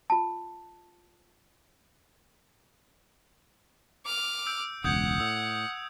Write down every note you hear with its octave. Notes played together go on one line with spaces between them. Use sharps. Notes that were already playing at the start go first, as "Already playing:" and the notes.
F4 A5
D6 F6
E6 G6 D7
E1 C#2 F#5 D#6 G6 G#6
A2 E6